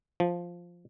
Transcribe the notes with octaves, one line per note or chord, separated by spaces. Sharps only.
F3